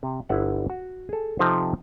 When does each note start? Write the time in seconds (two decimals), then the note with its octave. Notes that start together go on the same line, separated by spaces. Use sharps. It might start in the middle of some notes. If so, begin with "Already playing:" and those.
0.03 C3
0.29 G1 E4 E5 F#5
0.70 F#4
1.09 G#4 A4
1.39 C3 F3 C4 D#4 A4 C5